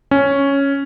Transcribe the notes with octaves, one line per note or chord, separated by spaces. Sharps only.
C#4